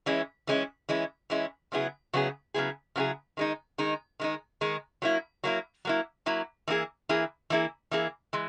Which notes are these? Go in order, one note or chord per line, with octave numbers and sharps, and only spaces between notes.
E3 G#3 C#4 E4
E3 G#3 C#4 E4
E3 G#3 C#4 E4
E3 G#3 C#4 E4
C#3 F#3 B3 E4 G#4
C#3 F#3 B3 E4 G#4
C#3 F#3 B3 E4 G#4
C#3 F#3 B3 E4 G#4
D#3 G#3 D#4
D#3 G#3 D#4
D#3 G#3 D#4
D#3 G#3 D#4
F#3 A#3 E4
F#3 A#3 E4
F#3 A#3 E4
F#3 A#3 E4
E3 A#3 E4 G#4
E3 A#3 E4 G#4
E3 A#3 E4 G#4
E3 A#3 E4 G#4
E3 G#3